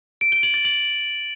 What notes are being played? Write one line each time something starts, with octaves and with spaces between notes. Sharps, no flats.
D7
G7
F#7
A6
F#7